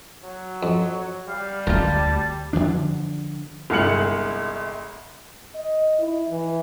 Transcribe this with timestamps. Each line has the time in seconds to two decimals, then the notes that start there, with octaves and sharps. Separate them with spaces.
0.24 F#3
0.63 F2
1.29 G3 F5
1.67 D2 C4 F4 A#4 A5
2.53 D3 E3 F3 D4
3.70 G1 C2 G#3 F6 C#7 F#7
5.55 D#5
5.99 E4
6.29 E3